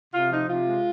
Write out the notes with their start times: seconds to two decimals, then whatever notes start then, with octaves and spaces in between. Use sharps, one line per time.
0.14 C3 F4
0.31 F3 D#4
0.48 C3 F4
0.66 G#3